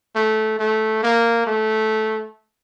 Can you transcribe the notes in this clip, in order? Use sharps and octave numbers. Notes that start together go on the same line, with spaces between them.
A3
A3
A#3
A3